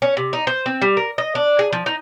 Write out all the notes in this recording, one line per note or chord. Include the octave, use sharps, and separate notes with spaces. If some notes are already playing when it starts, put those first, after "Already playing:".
C#4
C3
D#4
C5
C4
G3
A#4
D#5
D4
G#4
F3
D#4